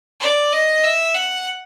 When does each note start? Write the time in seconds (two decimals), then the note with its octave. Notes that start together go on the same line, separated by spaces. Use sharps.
0.20 D5
0.52 D#5
0.84 E5
1.15 F#5